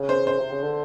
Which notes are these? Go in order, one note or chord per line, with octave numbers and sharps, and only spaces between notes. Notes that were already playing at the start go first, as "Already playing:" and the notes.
Already playing: C#3
C5
C5
C3
C#3
D3